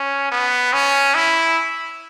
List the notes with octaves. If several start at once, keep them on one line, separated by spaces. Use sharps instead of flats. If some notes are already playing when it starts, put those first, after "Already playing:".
Already playing: C#4
B3
C#4
E4